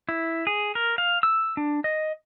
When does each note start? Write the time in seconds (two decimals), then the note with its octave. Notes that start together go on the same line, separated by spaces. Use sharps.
0.09 E4
0.47 G#4
0.75 A#4
0.98 F5
1.23 E6
1.57 D4
1.84 D#5